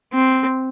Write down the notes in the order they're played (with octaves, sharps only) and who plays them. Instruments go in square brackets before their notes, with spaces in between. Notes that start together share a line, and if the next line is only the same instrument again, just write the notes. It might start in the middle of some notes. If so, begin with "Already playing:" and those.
[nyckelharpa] C4